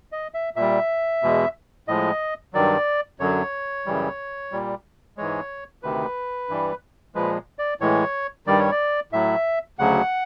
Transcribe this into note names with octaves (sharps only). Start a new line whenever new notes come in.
D#5
E5
A#2 G3 E5
E2 B2 G#3
A2 F3 G#3 D#5
G2 D#3 F#3 D5
F#2 D3 F#3 C#5
F#2 C#3 E3 G3
A#2 G3
G#2 E3 G#3 C#5
D2 C3 D#3 B4
G2 E3 G3
A#2 F3 G#3 B4
D5
A2 E3 G#3 C#5
G2 D#3 G3 D5
C#5
D5
A2 F#3 E5
D2 C#3 F#3 F#5